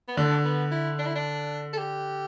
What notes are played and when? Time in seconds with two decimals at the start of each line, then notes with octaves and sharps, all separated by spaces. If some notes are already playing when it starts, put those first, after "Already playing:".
0.08 B3
0.17 D3 D4
0.45 B3
0.71 E4
0.98 D4
1.06 E4
1.15 D4
1.73 A4
1.78 G4